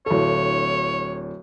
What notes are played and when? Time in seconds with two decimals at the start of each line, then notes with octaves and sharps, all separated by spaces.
0.06 D1 A4 C#5